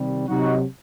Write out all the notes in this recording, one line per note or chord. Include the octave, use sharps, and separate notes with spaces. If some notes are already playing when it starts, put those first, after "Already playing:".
Already playing: C3 D#3 G3
C3 F#3 D#4 F#4